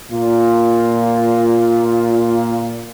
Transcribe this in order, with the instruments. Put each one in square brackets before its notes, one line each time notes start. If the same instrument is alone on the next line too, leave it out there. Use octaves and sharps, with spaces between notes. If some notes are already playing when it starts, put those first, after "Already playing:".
[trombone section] A#2 F4